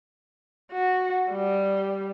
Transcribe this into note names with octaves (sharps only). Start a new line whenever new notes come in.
F#4
G3